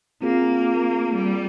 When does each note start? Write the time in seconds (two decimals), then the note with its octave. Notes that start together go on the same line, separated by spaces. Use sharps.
0.21 A#3 C4 F4 G#4
1.14 G3